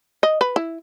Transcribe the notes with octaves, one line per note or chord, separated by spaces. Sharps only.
D#5
B4
E4